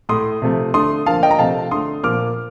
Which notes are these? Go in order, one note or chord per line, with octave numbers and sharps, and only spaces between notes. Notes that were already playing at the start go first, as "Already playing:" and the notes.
A2 A3 C6 D#6
C3 F3 A3
D3 A3 C6 D#6
D3 F3 A#3 F5 A5
D#5 G5
A#5
C3 F3 A3 F5 A5
D3 A3 C6 D#6
A#2 F3 A#3 D6 F6